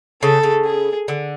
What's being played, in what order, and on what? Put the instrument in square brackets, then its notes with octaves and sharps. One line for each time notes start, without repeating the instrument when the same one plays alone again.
[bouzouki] C#3 [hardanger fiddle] A4
[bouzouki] C#3
[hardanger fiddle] G#4
[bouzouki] D3